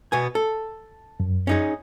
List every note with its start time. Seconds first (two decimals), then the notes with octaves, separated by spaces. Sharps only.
0.12 B2 B3 G#5
0.35 A4
1.20 F#2
1.47 C#4 D#4 G#4